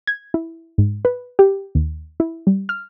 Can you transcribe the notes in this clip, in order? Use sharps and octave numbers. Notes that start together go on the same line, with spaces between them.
G#6
E4
G#2
B4
G4
D#2
E4
G3
F6